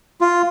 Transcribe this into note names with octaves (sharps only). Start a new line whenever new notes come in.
F4